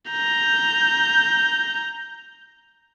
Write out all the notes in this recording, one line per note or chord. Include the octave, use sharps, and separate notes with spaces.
A#5 G6